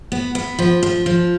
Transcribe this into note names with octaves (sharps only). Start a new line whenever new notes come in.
B3
B3
F3
F3
F3